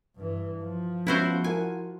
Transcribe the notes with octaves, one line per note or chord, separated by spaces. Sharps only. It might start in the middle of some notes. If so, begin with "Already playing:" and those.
G2 E3
F3
G#3 B3 C#4 E4 F#4 C5
E4 A#4 F#5 G#5